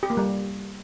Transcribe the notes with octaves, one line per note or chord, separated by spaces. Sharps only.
G4
A#3
G3